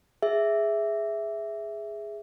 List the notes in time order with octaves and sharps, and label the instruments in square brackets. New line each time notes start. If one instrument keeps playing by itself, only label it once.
[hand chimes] G#4 E5